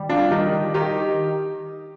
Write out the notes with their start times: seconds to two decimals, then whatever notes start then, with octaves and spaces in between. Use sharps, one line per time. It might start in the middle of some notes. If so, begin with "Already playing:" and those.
Already playing: D#3 G3
0.09 D4 F4
0.31 D#3 D#4 G4
0.74 D#3 D#4 G4